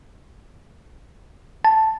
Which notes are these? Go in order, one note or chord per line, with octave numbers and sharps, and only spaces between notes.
A5